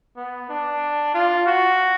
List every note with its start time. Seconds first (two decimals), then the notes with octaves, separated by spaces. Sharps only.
0.16 B3
0.49 D4
1.14 F4
1.46 F#4